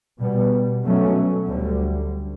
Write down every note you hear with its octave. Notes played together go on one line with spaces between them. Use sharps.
B2 G3 B3
B2 F#3 A3 C#4
D2 D3 G3